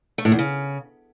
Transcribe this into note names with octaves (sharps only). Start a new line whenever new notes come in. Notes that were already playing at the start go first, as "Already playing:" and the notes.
A3
A2
E2
C#3